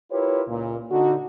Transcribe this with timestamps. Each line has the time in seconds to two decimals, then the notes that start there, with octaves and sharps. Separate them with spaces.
0.12 E4 F4 G4 A#4 B4 C#5
0.49 C#2 A#2
0.91 D3 D#4 F#4